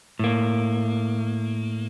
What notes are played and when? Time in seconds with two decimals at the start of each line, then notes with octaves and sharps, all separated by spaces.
0.19 A2 A#3